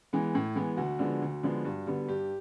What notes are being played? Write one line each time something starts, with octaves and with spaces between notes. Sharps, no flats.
E3 G#3 B3
A2
E3 G#3 B3
D2 F#4
D3 F3 G#3 B3
D2
D3 F3 G#3 B3
G2
D3 G3 B3
G2 G4